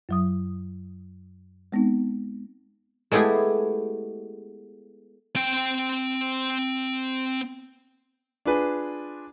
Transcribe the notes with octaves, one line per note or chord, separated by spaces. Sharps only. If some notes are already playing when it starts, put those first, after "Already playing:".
F#2 F#3 D#6
G#3 B3 C4 D#4
G#3 A3 B3 E4 G4 G#4
C4 G5
D4 F4 G#4 B4